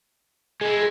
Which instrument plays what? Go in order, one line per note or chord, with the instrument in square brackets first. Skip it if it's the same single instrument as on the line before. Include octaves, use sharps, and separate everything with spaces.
[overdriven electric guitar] G#3 E4 [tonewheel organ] G#4